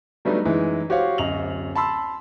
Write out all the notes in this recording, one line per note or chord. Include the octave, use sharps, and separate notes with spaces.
F#3 G3 A3 B3 D4 D#4
F#2 E3 G#3 D#4
F#4 G4 C5 C#5 F5
D1 F#2 D#5 F7 F#7
A5 B5 C6 E6